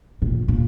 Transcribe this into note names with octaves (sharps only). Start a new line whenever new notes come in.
A#2
A#2